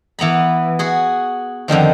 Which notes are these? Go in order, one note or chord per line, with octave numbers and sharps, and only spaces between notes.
E3 B3 A#5 B5
F#4 G#4
F2 D3 D#3 F3